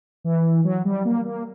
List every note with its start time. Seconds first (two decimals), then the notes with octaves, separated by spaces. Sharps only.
0.24 E3
0.64 F#3
0.85 G3
1.05 A#3
1.25 A#3